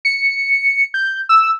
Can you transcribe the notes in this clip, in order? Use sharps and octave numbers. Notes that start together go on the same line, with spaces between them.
C#7
G6
E6